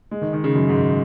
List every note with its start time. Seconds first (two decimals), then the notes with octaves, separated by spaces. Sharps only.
0.11 G#3
0.21 D#3
0.33 D#3
0.44 C#3
0.55 F#2
0.69 G#2